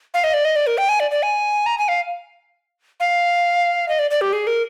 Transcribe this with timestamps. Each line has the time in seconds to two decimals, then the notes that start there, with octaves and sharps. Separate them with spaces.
0.14 F5
0.24 D#5
0.34 D5
0.45 D#5
0.56 D5
0.67 A#4
0.78 G5
0.89 G#5
1.00 D5
1.11 D5
1.23 G#5
1.66 A#5
1.78 G#5
1.88 F5
3.00 F5
3.88 D#5
3.99 D5
4.11 D5
4.21 G4
4.33 G#4
4.47 A#4